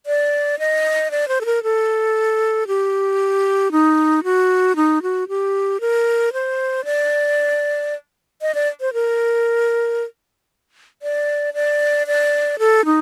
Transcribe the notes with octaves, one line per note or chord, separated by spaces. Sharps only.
D5
D#5
D5
C5
A4
A#4
A4
G4
D#4
F#4
D#4
F#4
G4
A#4
C5
D5
D#5
D5
C5
A#4
D5
D5
D5
A4
D#4